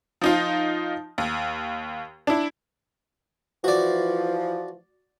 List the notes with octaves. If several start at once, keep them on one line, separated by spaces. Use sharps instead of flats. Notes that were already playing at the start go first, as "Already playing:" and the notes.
F3 D#4 F4
D#2
D4 E4
E3 F3 F#4 D5